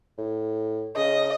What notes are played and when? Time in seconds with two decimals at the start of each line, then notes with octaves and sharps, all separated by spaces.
0.18 A2
0.96 C#3 D#5